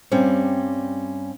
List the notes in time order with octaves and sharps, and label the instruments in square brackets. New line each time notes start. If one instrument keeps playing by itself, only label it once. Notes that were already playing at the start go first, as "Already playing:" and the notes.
[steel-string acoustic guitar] G2 G3 C4 C#4